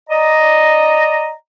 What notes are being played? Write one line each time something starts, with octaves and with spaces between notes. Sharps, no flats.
D5 D#5 A#5